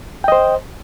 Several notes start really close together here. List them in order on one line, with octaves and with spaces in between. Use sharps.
G5 D#5 C5